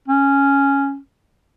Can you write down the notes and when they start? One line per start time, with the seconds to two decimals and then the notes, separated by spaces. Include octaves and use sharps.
0.08 C#4